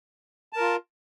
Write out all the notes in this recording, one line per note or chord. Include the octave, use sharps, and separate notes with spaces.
F4 A#4 A5